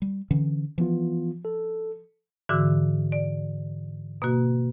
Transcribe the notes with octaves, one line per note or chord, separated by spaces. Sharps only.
G3
D3 E3 C#4
E3 F3 B3 F4
A4
G#2 D3 E3 F#4 D6 E6
D5
B2 A#3 F#4